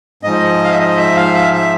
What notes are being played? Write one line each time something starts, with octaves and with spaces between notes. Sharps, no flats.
G#2 F3 D#5
F5
E5
D#5
E5
F5
E5
E5